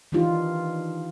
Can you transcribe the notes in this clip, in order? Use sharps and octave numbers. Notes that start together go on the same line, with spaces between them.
D#3 E3 D4 D#4 F4 G4